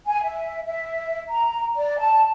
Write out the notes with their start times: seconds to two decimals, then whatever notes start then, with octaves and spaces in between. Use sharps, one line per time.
0.06 G#5
0.23 E5
0.66 E5
1.28 A#5
1.75 D5
1.98 A5